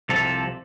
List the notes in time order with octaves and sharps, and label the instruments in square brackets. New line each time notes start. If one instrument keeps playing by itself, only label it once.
[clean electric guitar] C2 C3 F3 A4